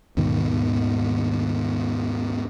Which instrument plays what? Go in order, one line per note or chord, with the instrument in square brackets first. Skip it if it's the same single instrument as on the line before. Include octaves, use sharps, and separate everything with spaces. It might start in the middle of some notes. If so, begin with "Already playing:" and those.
[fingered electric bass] D#2 G#2 B2 D#3